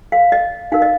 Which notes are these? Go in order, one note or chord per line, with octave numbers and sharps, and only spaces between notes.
F5
D#5
D#4 A#4 F5
D#5